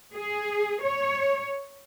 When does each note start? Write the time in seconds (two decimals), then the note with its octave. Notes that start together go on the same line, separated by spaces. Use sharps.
0.14 G#4
0.82 C#5